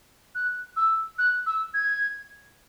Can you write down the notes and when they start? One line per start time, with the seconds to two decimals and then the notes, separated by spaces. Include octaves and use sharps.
0.35 F#6
0.76 E6
1.18 F#6
1.46 E6
1.74 G#6